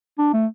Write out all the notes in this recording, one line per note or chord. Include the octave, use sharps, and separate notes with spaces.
D4
A3